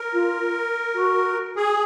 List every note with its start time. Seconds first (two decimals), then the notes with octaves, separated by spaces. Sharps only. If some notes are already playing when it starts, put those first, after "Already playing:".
Already playing: A#4
0.13 F4
0.94 F#4
1.56 G#4